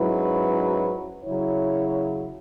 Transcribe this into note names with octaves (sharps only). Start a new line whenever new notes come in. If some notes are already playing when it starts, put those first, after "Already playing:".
Already playing: G#2 F#3 C#4 E4 B4
C#3 F#3 E4 C#5